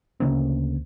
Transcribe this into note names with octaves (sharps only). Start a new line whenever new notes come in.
D2 C#3 A#3 C4